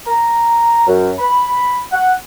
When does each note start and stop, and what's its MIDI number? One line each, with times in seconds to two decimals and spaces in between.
0.07 0.82 82
0.87 1.10 42
1.19 1.80 83
1.92 2.13 78